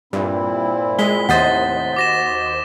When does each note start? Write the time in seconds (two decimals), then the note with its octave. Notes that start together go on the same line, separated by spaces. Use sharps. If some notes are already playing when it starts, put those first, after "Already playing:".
0.13 G2 A#2 C4 E4
0.99 G#3 B6 G7
1.29 D#2 A2 C3 C5 D#5 F#5 A6 B6
1.96 F#4 D6 A#6 E7